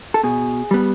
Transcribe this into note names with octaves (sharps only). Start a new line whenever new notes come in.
A4
B2 G#4
G3 B3